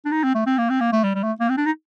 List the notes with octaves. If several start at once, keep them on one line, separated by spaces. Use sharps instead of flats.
D4
D#4
C4
A3
C4
A#3
C4
A#3
A3
G3
G3
A3
A#3
C4
D4
D#4